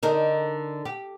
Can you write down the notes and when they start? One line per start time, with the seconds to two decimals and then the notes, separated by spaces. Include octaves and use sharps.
0.03 D3 D#4 A#4
0.85 G4